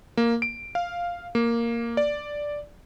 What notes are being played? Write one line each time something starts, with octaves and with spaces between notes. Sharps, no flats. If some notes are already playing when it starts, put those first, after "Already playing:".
A#3
D7
F5
A#3
D5